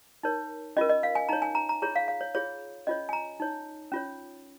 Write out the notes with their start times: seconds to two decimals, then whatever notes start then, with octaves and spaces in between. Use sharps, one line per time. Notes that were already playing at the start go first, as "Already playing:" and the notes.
0.23 D#4 A#4 C#5
0.77 C#4 F4 A#4 D#5
0.89 D#5
1.03 F5
1.15 G#5
1.29 D#4 C#5 A#5
1.42 G#5
1.55 A#5
1.69 A#5
1.82 F4 G#4 C#5 A#5
1.96 F5
2.08 F5
2.21 C#5
2.35 F4 G#4 C#5
2.87 C#4 F4 C#5 D#5
3.09 G#5
3.13 A#5
3.40 D#4 C#5
3.92 C#4 F4 C#5